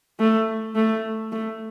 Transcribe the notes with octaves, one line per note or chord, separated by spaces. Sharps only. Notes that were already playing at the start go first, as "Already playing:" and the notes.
A3
A3
A3